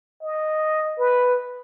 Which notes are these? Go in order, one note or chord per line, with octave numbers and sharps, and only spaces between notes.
D#5
B4